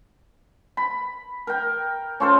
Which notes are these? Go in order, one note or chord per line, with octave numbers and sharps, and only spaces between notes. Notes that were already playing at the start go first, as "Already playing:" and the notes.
B5
A#4 G5
C#4 F4 A4 C5